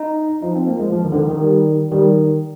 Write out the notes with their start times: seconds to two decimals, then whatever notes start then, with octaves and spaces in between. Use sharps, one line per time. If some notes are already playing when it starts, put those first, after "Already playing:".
Already playing: D#4
0.42 F3 D#4
0.56 C4
0.67 A#3
0.79 G#3
0.92 F3
1.05 D#3
1.12 D3
1.17 D#3
1.29 D#3
1.42 G3
1.91 D#3 G3